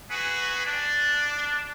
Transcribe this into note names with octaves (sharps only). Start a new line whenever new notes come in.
F#4 G#4 B4
D4